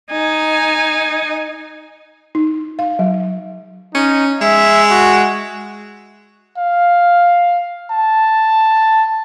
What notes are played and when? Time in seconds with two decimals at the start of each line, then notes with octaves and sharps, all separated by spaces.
0.12 D#4 G#5
2.35 D#4
2.79 F5
2.99 F#3
3.94 C#4 D#4
4.41 G#3 E5
4.91 F#4
6.58 F5
7.91 A5